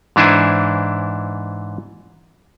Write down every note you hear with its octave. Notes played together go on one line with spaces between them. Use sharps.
G#2 E3 D4 E4 C5 G#5